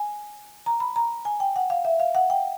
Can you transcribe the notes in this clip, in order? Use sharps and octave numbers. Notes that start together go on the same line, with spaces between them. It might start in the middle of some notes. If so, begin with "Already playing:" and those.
Already playing: G#5
A#5
B5
A#5
G#5
G5
F#5
F5
E5
F5
F#5
G5